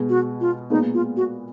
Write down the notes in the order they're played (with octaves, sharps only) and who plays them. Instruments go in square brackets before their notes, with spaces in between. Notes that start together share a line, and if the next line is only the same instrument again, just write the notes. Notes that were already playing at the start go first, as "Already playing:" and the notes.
Already playing: [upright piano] B2 G#3 B3
[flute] F#4
F4
[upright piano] A#2 G#3 B3 [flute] D#4
[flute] F4
F#4